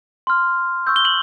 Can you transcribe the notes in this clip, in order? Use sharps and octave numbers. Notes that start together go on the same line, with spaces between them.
C6 F6
C#6 E6 G6
G7
F#7